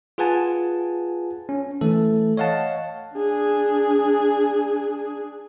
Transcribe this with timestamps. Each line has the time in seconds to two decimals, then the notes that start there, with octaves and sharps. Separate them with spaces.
0.18 F4 G#4 B4 F#5 G#5 A5
1.49 C#4
1.81 E3 A3 A4
2.37 C#5 D#5 F5 F#5 A5
3.16 D4 G#4